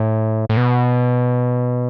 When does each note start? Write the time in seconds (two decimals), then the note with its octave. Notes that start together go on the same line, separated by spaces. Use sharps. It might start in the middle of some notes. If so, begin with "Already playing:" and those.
Already playing: A2
0.49 A2
0.57 B2